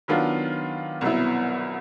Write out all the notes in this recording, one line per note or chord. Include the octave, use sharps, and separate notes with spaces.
D#3 F#3 B3 D4 F4
C2 B2 F#3 B3 E4